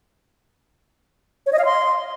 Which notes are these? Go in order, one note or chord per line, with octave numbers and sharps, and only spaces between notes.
C#5
D#5
F5
C6